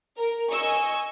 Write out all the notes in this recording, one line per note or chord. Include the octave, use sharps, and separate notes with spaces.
A#4
D#5 G#5 C#6 E6